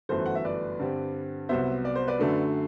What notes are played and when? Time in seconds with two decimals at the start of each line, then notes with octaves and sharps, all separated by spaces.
0.09 G1 F#2 E3 A3 A4 C5
0.26 F#5
0.35 E5
0.45 B4 D5
0.79 G2 D3 G3 C4
1.49 C2 C3 F#3 B3 C5 E5
1.85 D5
1.95 C5
2.08 B4 D5
2.19 F#2 D3 A3 D4